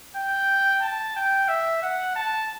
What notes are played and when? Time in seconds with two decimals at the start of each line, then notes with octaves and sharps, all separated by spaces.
0.16 G5
0.82 A5
1.16 G5
1.48 E5
1.82 F#5
2.15 A5